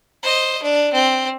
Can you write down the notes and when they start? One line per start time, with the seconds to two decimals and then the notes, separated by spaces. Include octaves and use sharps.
0.23 C5 D#5
0.62 D4
0.93 C4